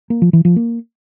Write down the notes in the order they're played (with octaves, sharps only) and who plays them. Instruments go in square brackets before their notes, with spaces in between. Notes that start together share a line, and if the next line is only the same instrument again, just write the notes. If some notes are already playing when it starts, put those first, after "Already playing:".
[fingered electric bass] A#3
F3
E3
F3
A#3